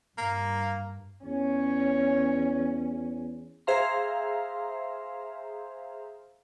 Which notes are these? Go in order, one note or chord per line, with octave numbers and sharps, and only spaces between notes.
G2 A#3
E2 C#4 C#5
G#4 C5 E5 F5 A#5 C6